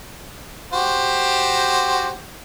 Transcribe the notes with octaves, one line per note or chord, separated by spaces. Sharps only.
F#4 G4 C5